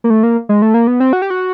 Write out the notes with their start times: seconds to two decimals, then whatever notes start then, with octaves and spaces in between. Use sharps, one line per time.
0.04 A#3
0.10 A3
0.23 A#3
0.49 G#3
0.62 A3
0.74 A#3
0.87 B3
1.00 C4
1.13 F#4
1.22 G4
1.30 F#4